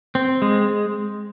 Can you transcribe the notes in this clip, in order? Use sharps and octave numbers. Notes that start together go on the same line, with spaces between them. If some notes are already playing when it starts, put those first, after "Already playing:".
C4
G#3